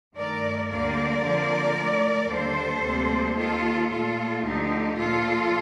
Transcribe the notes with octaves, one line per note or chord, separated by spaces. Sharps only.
G2 D#3 A3 A#4 D5
D2 D3 G3 A#3 A#4 D5
F2 D3 F3 A#3
A2
A3
D#2 D3 G3 A#3 A4 C5
D2 C3 G3 A#3
D#2 D#3 A#3 F4 A4
A#2 A3 F4 A4
D2 D3 F3 A3 D#4 G4
A#2 F3 A#3 F4 A4